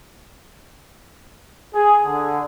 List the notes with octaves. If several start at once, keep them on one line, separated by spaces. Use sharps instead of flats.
G#4
D3